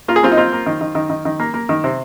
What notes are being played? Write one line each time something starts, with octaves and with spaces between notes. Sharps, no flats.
A#3 F4
G#4
A#3 C4 F4
D#4
A#3 C4 F4
A#3
D#3
D#3
D#3
D#3
D#3
A#3
A#3
D#3
C3